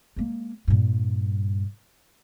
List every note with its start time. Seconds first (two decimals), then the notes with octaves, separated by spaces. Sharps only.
0.17 G#3 A#3
0.68 G2 A#2